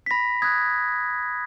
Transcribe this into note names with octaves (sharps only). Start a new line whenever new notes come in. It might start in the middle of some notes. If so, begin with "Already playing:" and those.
B6
B5 A#6
D#6 F#6 G#6